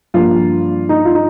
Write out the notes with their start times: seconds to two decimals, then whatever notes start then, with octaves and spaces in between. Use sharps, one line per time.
0.14 G2 F3 A#3 F4
0.89 D#4
1.05 F4
1.15 D#4